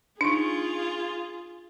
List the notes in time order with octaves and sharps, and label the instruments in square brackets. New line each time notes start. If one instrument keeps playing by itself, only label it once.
[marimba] D4 D#4 [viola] F4 G#4